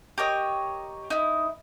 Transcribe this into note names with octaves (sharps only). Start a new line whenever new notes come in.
G4 A#4 C#5 D#5
D#4 E4